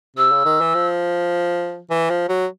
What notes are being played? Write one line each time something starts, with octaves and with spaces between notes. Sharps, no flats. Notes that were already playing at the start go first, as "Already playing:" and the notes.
C3 E6
C#3
D#3
E3
F3
E3
F3
F#3